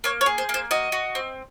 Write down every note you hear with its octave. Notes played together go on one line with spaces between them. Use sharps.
A#3 C#5
C#5
G#4
C5
A#3
C5
F#4 D#5
F#4
C4